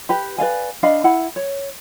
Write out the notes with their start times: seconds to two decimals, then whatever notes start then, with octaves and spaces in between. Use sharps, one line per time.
0.09 G4 B4 B5
0.38 B4 D5 F5 G#5
0.83 D4 D#5 F5 B5
1.04 E4 F#5 B5
1.36 C#5